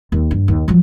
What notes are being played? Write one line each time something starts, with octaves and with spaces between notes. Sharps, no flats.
D#2
G2
D#2
F3 F#3